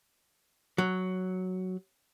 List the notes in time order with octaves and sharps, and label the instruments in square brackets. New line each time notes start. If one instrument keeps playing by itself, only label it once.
[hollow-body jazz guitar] F#3